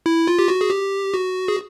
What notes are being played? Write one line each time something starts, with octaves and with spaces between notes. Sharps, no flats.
E4
F4
G4
F#4
G#4
G4
F#4
G#4